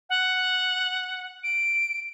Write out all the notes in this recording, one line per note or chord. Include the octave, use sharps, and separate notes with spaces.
F#5
D7